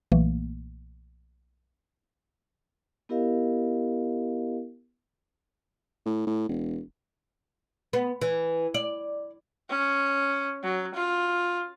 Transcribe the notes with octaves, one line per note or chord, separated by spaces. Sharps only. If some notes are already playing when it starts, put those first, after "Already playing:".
B1 A#2 E3 A3 A#3
B3 E4 G4 A#4 D#5 F5
A2
A2
E1
B3
E3
D5
C#4
F#3
F4